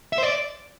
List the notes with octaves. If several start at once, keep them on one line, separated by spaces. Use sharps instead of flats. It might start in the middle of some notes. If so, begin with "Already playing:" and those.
E5
C5
D5